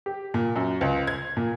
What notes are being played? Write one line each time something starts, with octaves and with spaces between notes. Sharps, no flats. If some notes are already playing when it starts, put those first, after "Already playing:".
G4
A#2
F#2
C#2
G#6
A#2